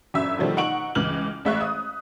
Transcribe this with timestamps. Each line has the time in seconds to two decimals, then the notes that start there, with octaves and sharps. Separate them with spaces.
0.14 G1 F#2 E5 E6
0.38 B2 D3 D#3 F3 G3 A3
0.57 D#4 F#5 C#6 D7 F#7
0.95 C#2 E3 F6 F#7
1.45 A1 G#3 E5 F5 C#6 F#6
1.61 D#6